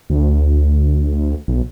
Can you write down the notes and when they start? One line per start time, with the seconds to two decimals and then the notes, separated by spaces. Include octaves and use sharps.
0.10 D2
1.48 B1